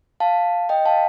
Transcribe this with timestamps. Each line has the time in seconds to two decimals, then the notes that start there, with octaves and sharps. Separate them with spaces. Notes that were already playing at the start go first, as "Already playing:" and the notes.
0.20 F5 A5
0.69 D#5 G5
0.85 F5 A5